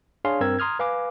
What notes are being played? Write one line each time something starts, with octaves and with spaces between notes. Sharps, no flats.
D4 G#4 C#5 F5 G#5 C6
G2 C4 A#4 E6 G#6
A#5 C6 D#6 F6 G#6
B4 F5 G#5 D6